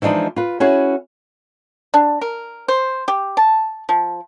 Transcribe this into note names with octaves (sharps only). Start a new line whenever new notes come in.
E3 F3 G#3 D4 D#4
F4 B4
C#4 E4 F#4 G#4 B4
D4
A#4
C5
G4
A5
F3